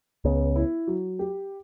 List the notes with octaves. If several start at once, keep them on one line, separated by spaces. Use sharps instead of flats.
C#2 C#3 B3
E4
F#3
G4